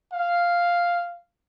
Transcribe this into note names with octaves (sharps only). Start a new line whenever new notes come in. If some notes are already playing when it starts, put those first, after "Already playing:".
F5